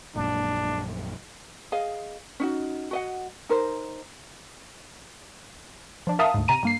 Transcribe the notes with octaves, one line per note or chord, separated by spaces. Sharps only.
A#1 F#2 A#2 D4
G#4 D#5 F5
C#4 D#4 F#4
F#4 D#5 F#5
D#4 A#4 C5
F3 D4
A#4 E5 F5 A5 D#6
D2 G#2
C3 A#5 D#7
G2 A#3 C7